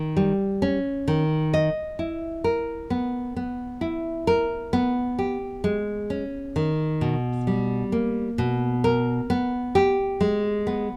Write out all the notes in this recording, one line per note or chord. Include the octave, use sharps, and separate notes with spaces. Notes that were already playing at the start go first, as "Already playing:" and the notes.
Already playing: D#3
G3
C#4
D#3
D#5
E4
A#4
B3
B3
E4
A#4
B3
G4
G#3
C#4
D#3
B2
G3
A#3
B2
A#4
B3
G4
G#3
B3